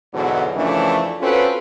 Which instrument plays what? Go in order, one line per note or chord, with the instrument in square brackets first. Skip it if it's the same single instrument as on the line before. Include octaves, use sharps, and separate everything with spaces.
[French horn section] E2 G#2 B2 D3 E3 F#3
F#2 C#3 E3 F3 A3 D4
C4 C#4 F4 F#4 A4 B4